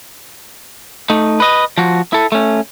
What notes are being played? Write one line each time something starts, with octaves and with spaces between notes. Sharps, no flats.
A3 D#4
B4 D#5
F3 F#4
E4 A4
A3 C#4